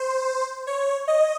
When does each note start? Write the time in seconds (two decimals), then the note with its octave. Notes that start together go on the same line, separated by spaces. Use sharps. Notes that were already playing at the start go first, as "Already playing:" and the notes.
Already playing: C5
0.67 C#5
1.08 D#5